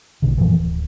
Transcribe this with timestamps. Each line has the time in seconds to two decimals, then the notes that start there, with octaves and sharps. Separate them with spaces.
0.22 A#1 B2 D3
0.38 F#2 A#2 E3 F3
0.57 D1